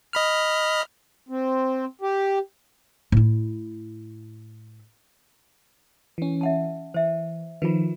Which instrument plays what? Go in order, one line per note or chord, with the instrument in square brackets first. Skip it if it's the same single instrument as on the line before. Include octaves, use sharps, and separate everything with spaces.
[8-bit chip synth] D#5 B5 F6
[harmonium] C4
G4
[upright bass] A2 E4
[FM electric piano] E3 C#4
[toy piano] E5 F#5 A5
[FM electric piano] E3 [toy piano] C5 E5
[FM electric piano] D#3 F3 [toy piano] F4 B4